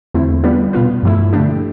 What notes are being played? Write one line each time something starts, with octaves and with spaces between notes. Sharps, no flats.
E2 D3 A3 C4 E4
G3 B3 D4 F4 B4
B2 B3 F4 B4
G2 F3 A3 E4
D3 A3 D4 G4